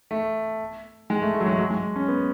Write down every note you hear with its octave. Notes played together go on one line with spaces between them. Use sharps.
A3
G#3
A3
A3
F#3
G#3
F#3
G#3
C#4
B3